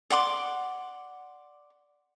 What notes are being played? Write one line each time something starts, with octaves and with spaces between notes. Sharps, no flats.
D5 F#5 C6 D6